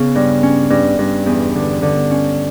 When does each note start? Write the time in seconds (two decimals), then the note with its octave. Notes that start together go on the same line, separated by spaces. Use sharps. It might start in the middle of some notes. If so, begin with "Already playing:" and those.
Already playing: C#3 B3
0.15 G2
0.43 C#4
0.70 G2
0.99 G2
1.26 E2
1.55 D3
1.82 D3
2.11 C#4